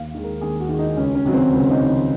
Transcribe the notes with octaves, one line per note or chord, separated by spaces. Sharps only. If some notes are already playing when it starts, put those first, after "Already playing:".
Already playing: D#2 F5
D#3 G#3
A#4
D#2 G#4
F#4
D#3 G#3
D#4
C#2 C#4
C#4
C3 D#3 F#3
C4
C#2
C#4
D#4
C3 D#3 F#3
D#4